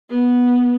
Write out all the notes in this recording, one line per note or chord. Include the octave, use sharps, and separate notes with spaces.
B3